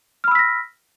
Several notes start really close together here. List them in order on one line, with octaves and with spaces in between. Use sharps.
F6 B5 E6 B6 A#6